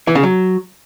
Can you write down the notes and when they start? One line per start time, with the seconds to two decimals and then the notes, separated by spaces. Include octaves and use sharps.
0.07 E3
0.15 C#3
0.23 F#3